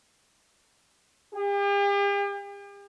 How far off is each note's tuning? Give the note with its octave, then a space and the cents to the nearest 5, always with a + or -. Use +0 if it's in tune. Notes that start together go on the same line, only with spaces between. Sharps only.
G4 +45